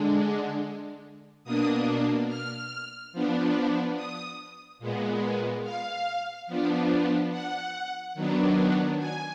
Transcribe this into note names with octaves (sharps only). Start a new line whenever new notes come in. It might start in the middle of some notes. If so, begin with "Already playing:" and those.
Already playing: D3 G#3 D4
B2 A#3 D4 D#6
F6
F3 B3 D4
D#6
A#2 G#3 B3
F5
F3 B3 D4
F#5
D#3 F#3 B3 D4
G#5